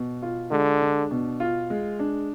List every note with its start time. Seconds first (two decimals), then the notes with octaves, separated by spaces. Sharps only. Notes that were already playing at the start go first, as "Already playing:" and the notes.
Already playing: B2
0.22 F4
0.51 D3 G#3
0.81 D4
1.11 B2
1.40 F4
1.70 G#3
1.99 D4